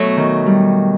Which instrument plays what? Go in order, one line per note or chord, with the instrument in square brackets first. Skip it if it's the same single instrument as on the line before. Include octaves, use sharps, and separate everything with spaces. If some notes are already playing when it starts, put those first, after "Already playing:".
Already playing: [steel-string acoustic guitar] B2 F#3 A3
[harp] D#3
G3